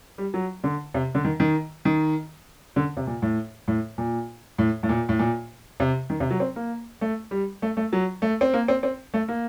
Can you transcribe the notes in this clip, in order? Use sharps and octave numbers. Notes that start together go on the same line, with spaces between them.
G3
F#3
D3
C3
D3
D#3
D#3
D#3
D3
C3
A#2
A2
A2
A#2
A2
A2
A#2
A2
A#2
C3
D#3
C3
F#3
C4
A#3
A3
G3
A3
A3
F#3
A3
C4
A#3
C4
C4
A3
A#3